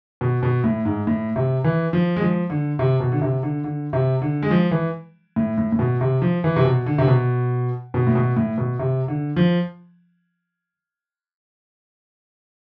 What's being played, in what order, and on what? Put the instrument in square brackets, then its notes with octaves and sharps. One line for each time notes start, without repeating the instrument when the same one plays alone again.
[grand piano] B2
B2
A2
G#2
A2
C3
E3
F3
G#3
F3
D3
C3
B2
D3
C3
D3
D3
C3
D3
G#3
F3
E3
A2
A2
A2
B2
C3
F3
E3
C3
B2
D3
C3
B2
B2
A2
B2
A2
B2
C3
D3
F3